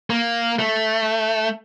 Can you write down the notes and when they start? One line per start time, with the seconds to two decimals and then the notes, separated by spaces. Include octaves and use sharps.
0.10 A#3
0.59 A3